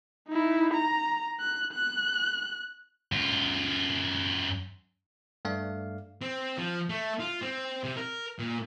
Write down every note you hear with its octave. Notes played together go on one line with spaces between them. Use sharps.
D#4 E4
A#5
F#6
F#6
F#2 F4
G2 A3 D5 F5
C4
F3
A3
F4
C4
C3
A#4
A#2